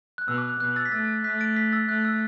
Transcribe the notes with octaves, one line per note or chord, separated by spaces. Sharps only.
F#6
B2 E6
D6
F#6
B2 F#6
E6 A6
B6
A3 E6 A6
A3 F#6 B6
A6 D7
F#6 B6
E6 A6
A3 F#6
E6